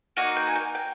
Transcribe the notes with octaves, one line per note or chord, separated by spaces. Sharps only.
A#3 D#4 F#4
G5
G#5
G5
G5